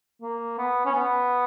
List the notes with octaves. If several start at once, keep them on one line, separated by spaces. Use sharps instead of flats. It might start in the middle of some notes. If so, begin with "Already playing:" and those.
A#3
B3
C#4
B3